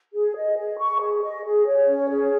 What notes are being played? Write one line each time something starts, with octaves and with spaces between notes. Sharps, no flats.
G#4
D#5
G#4
C#6
G#4
D#5
G#4
C#5
C#4
G#4